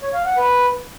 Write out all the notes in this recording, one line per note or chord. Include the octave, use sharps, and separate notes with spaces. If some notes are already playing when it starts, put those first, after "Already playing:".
C#5
F5
F#5
B4